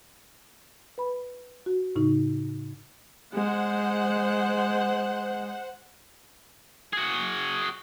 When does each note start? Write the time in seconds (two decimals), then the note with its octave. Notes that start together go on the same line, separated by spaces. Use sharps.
0.98 B4 B5
1.66 F#4
1.96 A2 C#3 D#4
3.34 G#3 C5 F#5
6.93 F#4 G#4